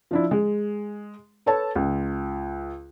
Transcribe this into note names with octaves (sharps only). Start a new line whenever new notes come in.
F3 D4 E4
G#3
A4 B4 C#5 A5
C#2